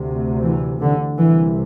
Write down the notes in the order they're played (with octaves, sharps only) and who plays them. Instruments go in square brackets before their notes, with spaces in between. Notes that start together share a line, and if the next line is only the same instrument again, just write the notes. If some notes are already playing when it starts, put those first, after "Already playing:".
Already playing: [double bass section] D2 C3
E3
D3
C2 C3 E3